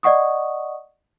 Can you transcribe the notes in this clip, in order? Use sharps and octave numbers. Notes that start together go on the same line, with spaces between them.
D5 D#5 F#5 C#6 D#6